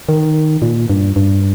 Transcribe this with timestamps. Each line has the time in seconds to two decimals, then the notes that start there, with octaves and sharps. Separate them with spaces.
0.09 D#3
0.62 A#2
0.90 G2
1.16 G2